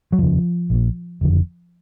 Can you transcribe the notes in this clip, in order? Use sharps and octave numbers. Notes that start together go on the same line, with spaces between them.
F#3
F1 D#2 C#3 F3
A#1 A#2
F#1 F2 D3